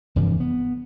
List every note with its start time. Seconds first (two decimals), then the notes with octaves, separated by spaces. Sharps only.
0.16 F1 G2 E3 G3
0.40 B3